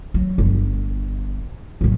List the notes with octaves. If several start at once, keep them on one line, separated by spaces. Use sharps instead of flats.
F#3
G1
A2 F#3